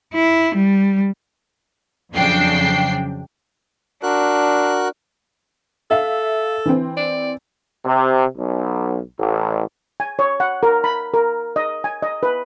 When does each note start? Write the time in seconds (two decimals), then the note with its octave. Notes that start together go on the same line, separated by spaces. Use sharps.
0.14 E4
0.55 G3
2.14 F2 C#3 F#3 D4 G5 C7
4.03 D4 F#4 A#4 F#6
5.91 A4 E5 F5
6.66 E3 C4
6.97 D5
7.85 C3
8.37 B1
9.18 A1
10.00 G#5
10.19 C#5
10.40 F#5
10.63 A#4
10.84 B5
11.14 A#4
11.56 D#5
11.84 G#5
12.03 D#5
12.23 B4